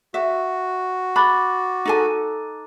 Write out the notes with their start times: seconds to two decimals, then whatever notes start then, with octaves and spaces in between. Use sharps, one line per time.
0.14 F#4 E5
1.16 B5 D6 F#6 A6
1.85 D#4 A4 G#5